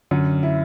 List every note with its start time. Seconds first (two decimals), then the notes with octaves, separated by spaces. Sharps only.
0.11 F#2 D3
0.43 E4